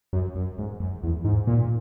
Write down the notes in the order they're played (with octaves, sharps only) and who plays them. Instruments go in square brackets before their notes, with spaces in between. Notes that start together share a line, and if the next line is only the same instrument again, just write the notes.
[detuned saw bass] F#2
F#2
G#2
F#2
E2
G#2
A#2